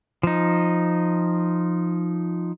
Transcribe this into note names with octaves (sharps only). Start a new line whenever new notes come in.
F3 D#4